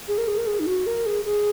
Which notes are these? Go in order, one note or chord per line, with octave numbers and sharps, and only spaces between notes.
G#4
A#4
G#4
A#4
G#4
D#4
F#4
A#4
G#4
G#4